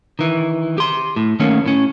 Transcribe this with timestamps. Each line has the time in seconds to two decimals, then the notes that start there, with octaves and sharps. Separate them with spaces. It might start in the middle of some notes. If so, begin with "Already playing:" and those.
0.19 D#3 E3
0.78 G4 C6
1.16 A2
1.40 D#3 A3 A#3 C#4
1.66 A2 C#4